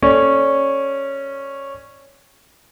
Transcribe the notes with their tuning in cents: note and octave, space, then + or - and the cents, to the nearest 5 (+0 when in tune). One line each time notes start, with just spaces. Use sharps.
C#4 -10 A4 +0 D5 +0